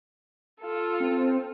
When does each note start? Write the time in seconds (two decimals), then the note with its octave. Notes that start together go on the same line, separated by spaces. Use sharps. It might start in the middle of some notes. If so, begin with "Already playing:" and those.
0.61 F4 A4
1.00 C4